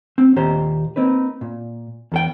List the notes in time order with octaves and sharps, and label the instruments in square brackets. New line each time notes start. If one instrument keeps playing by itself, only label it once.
[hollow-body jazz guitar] C4
D#2 A#2 G4 C5 A#5
A#3 C4 D#4 B4
A#2
E2 A4 G5